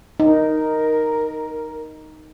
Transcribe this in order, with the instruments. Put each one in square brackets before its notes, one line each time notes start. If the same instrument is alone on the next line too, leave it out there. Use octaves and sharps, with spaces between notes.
[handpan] D#4 [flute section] A#4